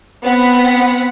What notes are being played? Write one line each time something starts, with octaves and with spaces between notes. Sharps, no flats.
B3 C4 F#5 B6